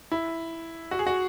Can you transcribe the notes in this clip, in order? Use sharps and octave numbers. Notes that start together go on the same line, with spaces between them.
E4
F#4
G#4
F#4